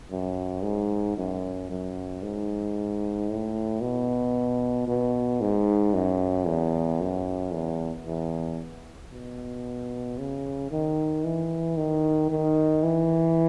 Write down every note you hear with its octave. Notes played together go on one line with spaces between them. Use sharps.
F#2
G#2
F#2
F#2
G#2
A2
B2
B2
G#2
F#2
E2
F#2
E2
E2
B2
C#3
D#3
E3
D#3
D#3
E3